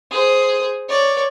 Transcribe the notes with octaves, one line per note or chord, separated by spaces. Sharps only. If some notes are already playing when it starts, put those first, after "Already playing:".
G#4 C5
C#5 D5